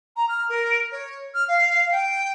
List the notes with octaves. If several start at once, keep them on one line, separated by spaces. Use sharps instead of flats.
A#5
F6
A#4
C#5
F6
F5
G5